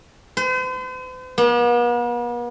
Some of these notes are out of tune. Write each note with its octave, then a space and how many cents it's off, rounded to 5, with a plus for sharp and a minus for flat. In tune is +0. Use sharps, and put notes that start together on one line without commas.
C5 -45
B3 -45